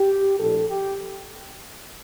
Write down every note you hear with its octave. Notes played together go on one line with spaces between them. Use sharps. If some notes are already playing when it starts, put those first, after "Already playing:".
Already playing: G4
A#1 A2 G3 A4
G4